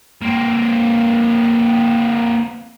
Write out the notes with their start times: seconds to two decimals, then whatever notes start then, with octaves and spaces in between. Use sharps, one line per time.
0.22 A#3 C4